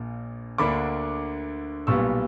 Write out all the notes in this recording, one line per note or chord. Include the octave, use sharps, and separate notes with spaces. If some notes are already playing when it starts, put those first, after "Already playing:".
Already playing: A#1 A#2
D2 D3 A#3 D4 B5 D6
B1 A#2 G3 B3 C#6 E6